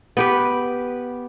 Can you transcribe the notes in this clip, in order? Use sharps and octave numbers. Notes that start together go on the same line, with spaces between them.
B3 G4 B4